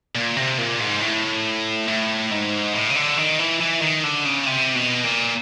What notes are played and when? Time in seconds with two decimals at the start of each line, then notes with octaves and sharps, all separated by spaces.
0.15 A#2
0.36 C3
0.58 A#2
0.80 G#2
1.01 A2
1.88 A2
2.31 G#2
2.74 A2
2.90 C#3
2.96 D3
3.17 D#3
3.39 E3
3.60 E3
3.82 D#3
4.04 D3
4.25 C#3
4.47 C3
4.75 B2
5.04 A#2